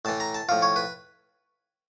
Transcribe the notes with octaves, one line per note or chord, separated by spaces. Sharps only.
A2 E3 A5
A#5
A5
A2 F3 F5
C#5
B4